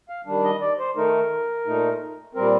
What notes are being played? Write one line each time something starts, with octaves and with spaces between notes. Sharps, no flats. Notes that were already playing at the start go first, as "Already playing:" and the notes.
F5
D#3 G3 D4
D#5
D5
C5
D#3 A3 D#4 A#4
A#2 A3 D#4
A#2 G3 C4 A#4